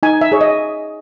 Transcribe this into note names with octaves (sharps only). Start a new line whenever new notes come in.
D#4 G#5
E5
G#4 C#5
D#5